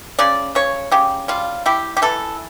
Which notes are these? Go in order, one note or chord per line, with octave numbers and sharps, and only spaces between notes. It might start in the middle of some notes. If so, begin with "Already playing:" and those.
C#3 D5
C#3 C#5
C#3 G4
G3 F4
E4 G4
G4
E3 A4